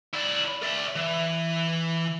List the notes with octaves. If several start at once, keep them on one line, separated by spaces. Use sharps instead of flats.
E4 D5
D5 E5
E3